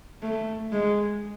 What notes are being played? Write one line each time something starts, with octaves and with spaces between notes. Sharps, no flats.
A3
G#3